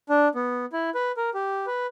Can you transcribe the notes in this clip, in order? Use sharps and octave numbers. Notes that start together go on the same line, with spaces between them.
D4
B3
E4
B4
A#4
G4
B4